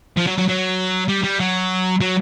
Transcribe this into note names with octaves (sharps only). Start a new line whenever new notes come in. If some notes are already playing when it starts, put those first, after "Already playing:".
F3
F#3
F#3
F#3
G3
G3
F#3
F#3